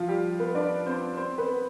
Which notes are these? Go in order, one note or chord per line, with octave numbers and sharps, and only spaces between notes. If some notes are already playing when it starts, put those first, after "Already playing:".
Already playing: F3 F4
G3 G4
B3 B4
D4 D5
C4 C5
C4 C5
B3 B4